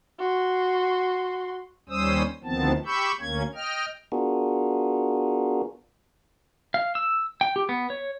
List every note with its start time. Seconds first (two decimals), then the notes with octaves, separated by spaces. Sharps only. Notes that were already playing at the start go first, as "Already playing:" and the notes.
0.19 F#4 C6
1.89 D#2 G3 C#4 C5 D#6 E6
2.44 D2 D#3 F3 B3 C4 A5
2.85 G4 B5 C#6 E6 G6
3.21 D2 A#3 C#4 G#6
3.55 D#5 G5 F6
4.12 B3 D4 F4 F#4 G#4 A#4
6.74 F5
6.95 E6
7.41 G5
7.56 G4
7.69 B3
7.90 C#5